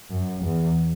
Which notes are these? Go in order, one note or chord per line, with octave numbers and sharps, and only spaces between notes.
F#2
E2